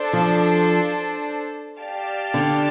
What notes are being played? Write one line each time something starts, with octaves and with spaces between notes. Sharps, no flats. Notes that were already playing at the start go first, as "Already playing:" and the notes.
Already playing: D4 A4 C5
F3
G4 D5 F5 A5
D3